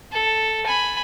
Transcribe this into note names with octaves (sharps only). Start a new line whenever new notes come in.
A4
G#5 B5